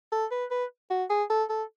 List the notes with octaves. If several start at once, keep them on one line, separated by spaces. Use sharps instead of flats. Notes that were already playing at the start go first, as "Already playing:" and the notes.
A4
B4
B4
F#4
G#4
A4
A4